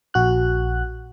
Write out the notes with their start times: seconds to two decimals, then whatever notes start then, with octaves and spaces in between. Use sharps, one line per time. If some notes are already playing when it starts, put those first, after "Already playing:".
0.14 A#1 F#4 F#6